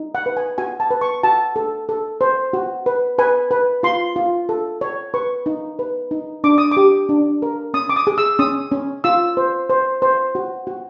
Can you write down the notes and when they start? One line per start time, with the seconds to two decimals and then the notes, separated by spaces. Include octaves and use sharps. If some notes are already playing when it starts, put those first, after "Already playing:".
Already playing: D#4
0.15 F#5
0.26 B4
0.37 G#5
0.58 F#4 G#5
0.80 A5
0.91 B4
1.01 C#6
1.23 F#4 A5
1.56 A4
1.89 A4
2.21 C5
2.53 F#4
2.86 B4
3.19 B4 G#5
3.51 B4
3.83 F4 C6
4.16 F4
4.49 A4
4.81 C#5
5.14 B4 C#6
5.46 D#4
5.79 B4
6.11 D#4
6.44 D4 D6
6.58 D#6
6.71 D6
6.77 G4
7.09 D4
7.42 A#4
7.74 C#4 D#6
7.89 D6
7.96 D#6
8.07 G#4
8.18 E6
8.39 C#4 D#6
8.72 C#4
9.04 F4 E6
9.37 C5
9.70 C5
10.02 C5
10.35 F#4
10.67 F#4